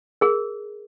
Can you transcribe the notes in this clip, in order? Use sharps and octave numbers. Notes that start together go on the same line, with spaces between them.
G#4 A#4